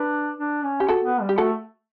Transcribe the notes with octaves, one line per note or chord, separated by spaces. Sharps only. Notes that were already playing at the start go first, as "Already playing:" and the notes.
Already playing: D4 B4
D4
C#4
G4
F#4 A4
B3
G3
G4
A3 F#4 A4